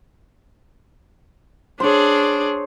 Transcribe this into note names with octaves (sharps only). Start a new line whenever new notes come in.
D4 G#4 C5 C#5